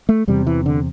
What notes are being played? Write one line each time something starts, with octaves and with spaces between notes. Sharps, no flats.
A3
E2 C3 G3
E3
D3